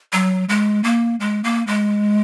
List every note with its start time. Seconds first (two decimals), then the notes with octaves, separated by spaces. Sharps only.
0.13 F#3
0.49 G#3
0.84 A#3
1.20 G#3
1.44 A#3
1.67 G#3